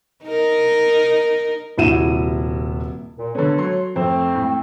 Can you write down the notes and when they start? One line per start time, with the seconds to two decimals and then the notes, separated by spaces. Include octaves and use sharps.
0.24 D#4 A#4
1.78 D#1 C3 E4 F#4 D#7 E7
3.17 A#2
3.35 D3 B3 A4 C#5
3.58 F#3 C6
3.96 F2 A3 C4 C5
4.35 A2